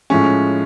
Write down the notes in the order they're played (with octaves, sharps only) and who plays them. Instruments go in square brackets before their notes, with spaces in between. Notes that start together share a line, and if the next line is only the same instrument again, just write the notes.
[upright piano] A2 F3 G#3 C#4